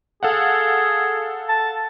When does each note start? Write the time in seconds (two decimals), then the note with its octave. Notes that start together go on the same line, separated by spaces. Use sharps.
0.23 G#4 A4 F5 F#5
1.48 A5